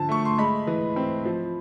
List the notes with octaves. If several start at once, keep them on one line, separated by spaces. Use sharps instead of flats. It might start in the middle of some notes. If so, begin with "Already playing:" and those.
Already playing: D3 F3 A5
A3 C#6
C6
G#3 B5
E3
C4
F3